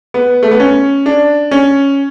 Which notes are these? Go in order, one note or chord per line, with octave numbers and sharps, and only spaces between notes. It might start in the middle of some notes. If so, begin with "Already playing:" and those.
B3
A3
B3
C#4
D4
C#4